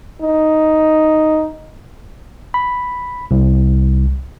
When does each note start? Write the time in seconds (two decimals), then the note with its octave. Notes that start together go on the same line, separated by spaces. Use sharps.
0.22 D#4
2.54 B5
3.31 C2